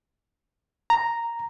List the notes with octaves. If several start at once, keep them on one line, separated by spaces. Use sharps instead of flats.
A#5